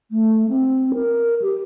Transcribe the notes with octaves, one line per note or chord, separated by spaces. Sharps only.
A3
C4
A#4
G4